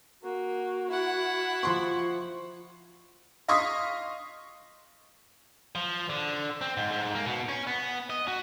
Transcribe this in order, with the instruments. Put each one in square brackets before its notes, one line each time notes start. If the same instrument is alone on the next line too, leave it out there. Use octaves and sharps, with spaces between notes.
[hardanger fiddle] A#3 [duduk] F#4
[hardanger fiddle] E4 F#5
[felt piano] F3 C6 C#6
[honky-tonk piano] D#5 F5 C6 C#6 D#6 B6
[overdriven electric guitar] F3
D3
C4
G#2
G#2
A#3
B2
C#4
B3
D#5
F#4